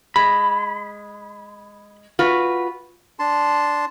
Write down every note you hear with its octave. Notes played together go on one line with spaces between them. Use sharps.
G#3 B5
F4 F#4 B4
D4 A5 C6